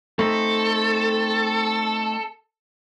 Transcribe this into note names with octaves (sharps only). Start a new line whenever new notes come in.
A3 C4 D#4 A4